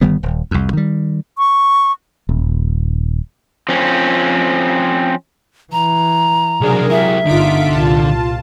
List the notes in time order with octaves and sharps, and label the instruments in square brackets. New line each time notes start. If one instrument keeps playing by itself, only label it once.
[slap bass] G1 D#3 G3 B3
D#1
C2 F2
D#3 G3
[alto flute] C#6
[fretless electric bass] D#1
[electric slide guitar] F3 C4 C#4
[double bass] E3 [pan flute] A#5
[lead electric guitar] B1 D4 [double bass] C3 F#3 [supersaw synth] G#4 A#4
[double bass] F#3 [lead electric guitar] E4 G4 [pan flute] E5
[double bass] G1 D#4 [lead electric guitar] D3 [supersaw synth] F4 B6 D7
[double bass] C2 A#2 [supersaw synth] F4 A5